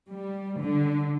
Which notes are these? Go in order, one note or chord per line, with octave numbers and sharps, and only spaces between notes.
G3
D3